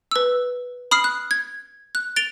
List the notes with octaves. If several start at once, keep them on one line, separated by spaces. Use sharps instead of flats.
B4 E6
B5 D#6 F6 C7
F#6
G#6
F#6
A6 D7 F7 G7